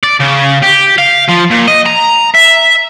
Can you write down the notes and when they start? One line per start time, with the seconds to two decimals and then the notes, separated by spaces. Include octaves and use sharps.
0.03 D5
0.20 C#3
0.63 G4
0.98 F5
1.28 F3
1.50 A#2
1.68 D#5
1.86 A#5
2.34 E5